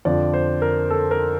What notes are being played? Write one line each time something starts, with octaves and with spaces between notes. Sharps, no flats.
F2 D3 F3 D5
C5
A#4
A4
A#4